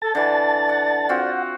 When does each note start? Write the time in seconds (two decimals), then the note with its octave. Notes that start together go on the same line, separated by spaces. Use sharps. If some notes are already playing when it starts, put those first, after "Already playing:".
0.02 A4 A5 A6
0.15 D3 E3 D5
0.69 F#5
1.09 C4 F4 F#4 F#5